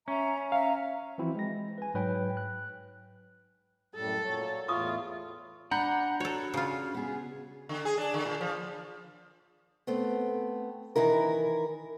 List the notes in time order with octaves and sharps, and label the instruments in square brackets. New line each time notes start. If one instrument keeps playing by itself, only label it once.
[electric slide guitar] C#4 [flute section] E5 A#5
[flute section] E5 A#5 [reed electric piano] F5
[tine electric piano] E3 F3 C4 E4 F#4
G#3 A#6
B4 G#5
G#2 F#3 B4 C#5 G5
F#6
[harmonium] F#2 A2 G3 [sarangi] A4
[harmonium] A#2 F#3 C#5
[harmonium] E2 A2 E4 [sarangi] F4 [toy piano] C#6 D#6
[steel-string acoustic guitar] D4 [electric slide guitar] F#5 [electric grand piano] A#5 B5 G6
[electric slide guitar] F#4 [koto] A4 C#5
[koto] C#3 F4
[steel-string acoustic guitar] B3 G#4
[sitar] D3
G#4
D4
D3
A#2
F3
[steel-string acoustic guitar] A3 B3 C4
D#3 E3 E4 A#4